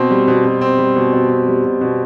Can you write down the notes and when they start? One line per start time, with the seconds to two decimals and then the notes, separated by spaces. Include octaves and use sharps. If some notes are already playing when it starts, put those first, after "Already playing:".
Already playing: B2 C4
0.10 G3
0.28 B2
0.45 B2
0.61 C4
0.78 G3
0.96 B2
1.13 B2
1.30 C4
1.48 G3
1.64 B2
1.81 B2